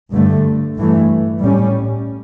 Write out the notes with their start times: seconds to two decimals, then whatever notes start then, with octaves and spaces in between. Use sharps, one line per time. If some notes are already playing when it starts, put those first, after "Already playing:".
0.12 G2 D3 A3
0.77 G2 E3 A3
1.41 A2 G3 C#4